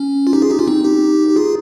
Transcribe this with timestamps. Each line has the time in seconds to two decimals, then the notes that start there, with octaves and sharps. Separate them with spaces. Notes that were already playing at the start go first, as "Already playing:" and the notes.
Already playing: C#4
0.27 F4
0.33 D#4 G4
0.42 F4 G#4
0.50 D#4 G4
0.59 C#4 F4
0.68 C4 D#4
0.84 D#4 G4
1.29 G4
1.36 F4 G#4